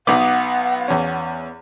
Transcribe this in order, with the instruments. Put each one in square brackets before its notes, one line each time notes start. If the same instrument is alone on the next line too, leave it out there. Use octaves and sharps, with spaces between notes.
[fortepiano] B1 D#4 D6 [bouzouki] B3 [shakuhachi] F#5
[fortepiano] E2 C#4